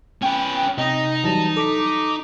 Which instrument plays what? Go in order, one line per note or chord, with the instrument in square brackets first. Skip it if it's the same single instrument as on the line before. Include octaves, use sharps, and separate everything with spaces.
[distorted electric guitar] C#4 B4 [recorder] G5
[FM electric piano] C3 [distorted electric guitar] D#4 [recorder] D#5
[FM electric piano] E3 F#3 G3 [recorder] A5
[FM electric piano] A4 B6 [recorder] D6